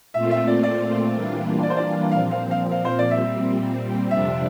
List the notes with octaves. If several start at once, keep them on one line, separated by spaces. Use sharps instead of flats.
A#2 A3 C4 F4 E5
E5
D5
D5
E3 G3 A#3 D4 F4
D5
C5
D5
A#2 F3 C4 F5
F5
F5
F5
C5
D5
A#2 G3 C4 E5
F2 C3 G3 D4 E5